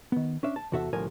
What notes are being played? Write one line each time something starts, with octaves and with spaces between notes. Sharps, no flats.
D#3 B3
C#4 D4 E5
A5
E2 C3 F#4 A4 E5 F#5
C2 A2 D3 F3 A#4 G#5